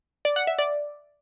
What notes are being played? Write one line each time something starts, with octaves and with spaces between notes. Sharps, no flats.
D5
F#5
E5
D5